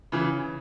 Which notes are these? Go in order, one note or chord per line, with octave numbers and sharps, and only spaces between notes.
C#3 E3